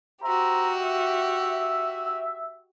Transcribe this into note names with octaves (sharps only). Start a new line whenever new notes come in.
F#4 G4 C5 E5 A#5
E5